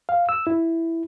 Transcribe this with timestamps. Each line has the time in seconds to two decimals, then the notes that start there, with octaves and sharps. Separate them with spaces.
0.09 F5
0.29 E6
0.47 E4